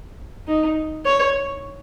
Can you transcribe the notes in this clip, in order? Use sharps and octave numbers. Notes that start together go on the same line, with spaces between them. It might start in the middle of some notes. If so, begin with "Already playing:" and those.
D#4
C#5